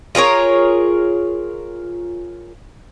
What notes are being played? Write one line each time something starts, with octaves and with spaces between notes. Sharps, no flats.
F4 G#4 A#4 C#5